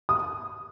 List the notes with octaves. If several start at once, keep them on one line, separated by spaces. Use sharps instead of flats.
D#6